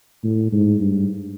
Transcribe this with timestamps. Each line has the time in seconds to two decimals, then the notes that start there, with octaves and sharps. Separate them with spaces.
0.24 A2
0.52 G#2
0.80 G2